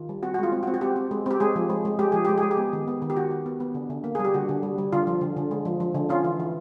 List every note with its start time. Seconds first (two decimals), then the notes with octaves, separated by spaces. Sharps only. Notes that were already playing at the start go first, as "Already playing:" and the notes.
Already playing: D#3 F4
0.09 G3
0.23 C4 F#4
0.34 F#4
0.38 G#3 F4
0.52 C4
0.63 F#4
0.67 C4
0.74 F#4
0.81 C4 G4
0.96 C4
1.11 G#3
1.26 C4 G4
1.40 G#3 G#4
1.56 F3
1.70 G#3
1.85 G#3
1.99 G#3 G4
2.12 F3 G#4
2.25 G#3 G4
2.38 G#4
2.43 G#3
2.51 G4
2.57 B3
2.73 D#3
2.88 B3
3.02 D#3
3.10 G4
3.16 D#3 F#4
3.31 D#3
3.46 B3
3.60 B3
3.75 D3
3.90 D3
4.04 A#3
4.15 G#4
4.19 G3
4.25 G4
4.34 D3 F#4
4.49 D3
4.63 G3
4.78 G3
4.93 D3 F4
5.07 F3
5.21 D3
5.37 D3
5.51 G#3
5.65 F3
5.80 F3
5.95 D3
6.09 C#4 F4
6.24 E3
6.40 E3